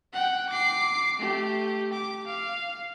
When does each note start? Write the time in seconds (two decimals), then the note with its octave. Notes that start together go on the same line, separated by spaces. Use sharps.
0.13 F#5 G5
0.50 D6 C7
1.19 A3 G4
1.93 D6
2.27 F5